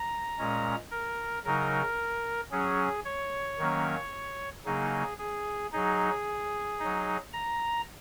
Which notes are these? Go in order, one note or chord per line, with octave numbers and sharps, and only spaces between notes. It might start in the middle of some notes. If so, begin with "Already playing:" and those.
Already playing: A#5
A#2 G#3 C#4
A#4
C#3 F#3 D#4 A#4
F#3 C#4 G#4
C#5
D#3 F#3 A#3 C#4
C#3 F#3 A#3 D#4 G#4
G#4
F#3 D#4 G#4
F#3 D#4
A#5